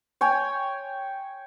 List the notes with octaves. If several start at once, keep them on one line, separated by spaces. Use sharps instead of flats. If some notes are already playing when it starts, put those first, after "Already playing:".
C#5 G5 G#5